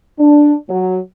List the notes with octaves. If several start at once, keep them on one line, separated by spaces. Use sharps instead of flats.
D4
F#3